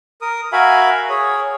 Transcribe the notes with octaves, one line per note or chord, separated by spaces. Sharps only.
A#4 D#6
F#4 A#4 E5 F5 G#5 B5
G#4 C#5